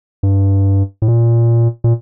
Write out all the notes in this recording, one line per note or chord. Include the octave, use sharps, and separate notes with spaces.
G2
A2
A#2
A#2